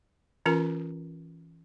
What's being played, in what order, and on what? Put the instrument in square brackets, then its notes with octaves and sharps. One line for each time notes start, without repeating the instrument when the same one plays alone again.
[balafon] E3 C#4 F4 A#4 A#5